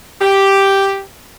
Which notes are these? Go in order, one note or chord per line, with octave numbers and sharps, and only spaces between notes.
G4